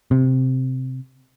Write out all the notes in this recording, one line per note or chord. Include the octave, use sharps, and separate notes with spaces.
C3